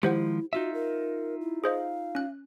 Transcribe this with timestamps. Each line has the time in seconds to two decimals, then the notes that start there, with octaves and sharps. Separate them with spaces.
0.03 D#3 F3 G#3 E4 G4 C5 F#5
0.53 D#4 F4 F#4 E5
0.74 A#4
1.41 E4
1.64 G#4 C5 D#5 F5
2.15 C#4 F#6